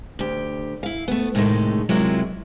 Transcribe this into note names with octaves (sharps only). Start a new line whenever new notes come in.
D2 G4
E4 F5
A3 B3
A2 C3 D#3 G#3 A3
C3 F#3 G#3 A#3 E4 F4